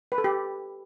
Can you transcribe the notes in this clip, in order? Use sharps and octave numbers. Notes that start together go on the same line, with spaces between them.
B4
A4
G4